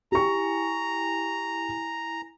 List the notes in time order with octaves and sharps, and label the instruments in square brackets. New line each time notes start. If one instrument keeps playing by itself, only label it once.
[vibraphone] E4 G#5 [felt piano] G4 C#6 [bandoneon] A#5